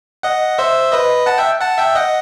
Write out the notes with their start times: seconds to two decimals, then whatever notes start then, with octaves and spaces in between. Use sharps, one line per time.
0.23 D#5 F#5
0.58 C5 E5
0.92 B4 D#5
1.26 F#5 A5
1.38 E5 G5
1.61 F#5 A5
1.78 E5 G5
1.95 D#5 F#5